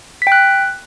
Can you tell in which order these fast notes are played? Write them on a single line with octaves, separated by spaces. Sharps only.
B6 G5 F#6